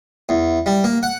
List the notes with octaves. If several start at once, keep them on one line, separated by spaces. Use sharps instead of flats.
E2
G3
A#3
F#5